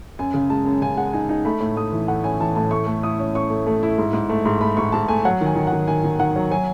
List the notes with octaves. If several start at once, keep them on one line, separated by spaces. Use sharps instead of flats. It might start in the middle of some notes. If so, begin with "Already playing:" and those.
F#2 G#5
C#3
G#3 A5
F#2
C#3 G#5
G#3 F#5
D#4 G#5
D#4 G#5
A3 B5
A2
A3 D#6
E3
A3 F#5
C#4 G#5
E3 A5
A2 A5
A3 C#6
A3
E4 D#6
C#4
C#4 C#6
A3
A3
E4
G#2
G#2
A3
G#2
A3 B5
G#2 C#6
G#2 A5
A3 G#5
F#3 F#5
D#3
G#5
D#3
F#5
D#3
D#3 G#5
D#3
D#3 F#5
F#3
F#3 G#5